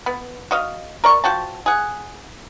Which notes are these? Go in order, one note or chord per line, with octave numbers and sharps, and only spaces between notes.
B3
F#4 D#5 F5
A#4 D5 C#6
F3 F#4 G5 A5
G#4 F#5